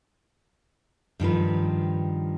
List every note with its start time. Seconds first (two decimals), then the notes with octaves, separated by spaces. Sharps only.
1.20 G2 D#3 F3 B4